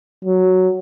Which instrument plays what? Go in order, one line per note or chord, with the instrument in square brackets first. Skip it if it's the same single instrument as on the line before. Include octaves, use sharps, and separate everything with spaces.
[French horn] F#3